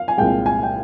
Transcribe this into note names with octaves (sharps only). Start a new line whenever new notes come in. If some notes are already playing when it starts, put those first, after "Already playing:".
Already playing: F5
G#5
C2 A#2 G#3 G5
G#5
G5